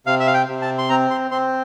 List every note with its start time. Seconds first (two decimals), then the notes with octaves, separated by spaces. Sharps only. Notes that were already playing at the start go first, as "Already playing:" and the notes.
0.07 C3 F5
0.20 E5
0.27 F5
0.34 G5
0.48 C3
0.62 A5
0.78 C6
0.89 C4 A#5
1.10 C6
1.31 C4 C6